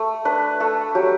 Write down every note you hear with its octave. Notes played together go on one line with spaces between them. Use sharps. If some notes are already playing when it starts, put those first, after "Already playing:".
Already playing: A3
D4 B4
A3 A4
F#3 G4